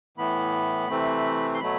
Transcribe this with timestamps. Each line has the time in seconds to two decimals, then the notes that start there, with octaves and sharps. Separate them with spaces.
0.17 A2 E3 B3 B5
0.89 C3 E3 A3 C4
1.54 C6
1.60 B2 F#3 A3 B5